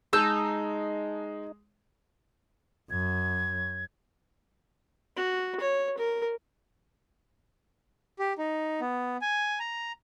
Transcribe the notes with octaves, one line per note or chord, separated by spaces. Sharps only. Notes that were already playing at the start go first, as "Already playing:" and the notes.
G#3 D#4 A5 E6 G6
F#2 G#6
F#4
C#5
A#4
G4
D#4
B3
G#5
A#5